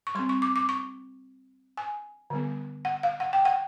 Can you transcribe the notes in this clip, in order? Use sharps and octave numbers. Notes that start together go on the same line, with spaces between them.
C#6
G3 C4 C6
C#6
D6
D6
C#6
G#5
D3 G3 B3
F#5
F5
F#5
G5
F#5